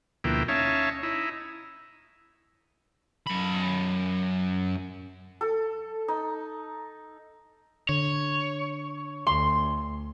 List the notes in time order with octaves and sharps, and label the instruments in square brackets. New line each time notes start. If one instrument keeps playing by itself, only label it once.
[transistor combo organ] D2 B2 F3 A#3 E4 G5
C#4 D#4 C#5 E5 F5 A5
D#4 E4
[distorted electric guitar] F#2 B5
[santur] A4
D#4
[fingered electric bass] D3 [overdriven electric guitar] C#5
[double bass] D2 [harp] C6